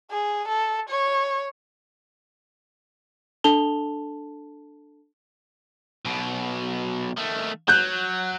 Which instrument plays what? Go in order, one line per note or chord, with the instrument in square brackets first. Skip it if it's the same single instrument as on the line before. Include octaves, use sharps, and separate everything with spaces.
[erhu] G#4
A4
C#5
[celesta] D4 A4 A5 F7 G7
[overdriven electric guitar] B1 B2
D#3 A3
[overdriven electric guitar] F#3 [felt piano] F#6 G6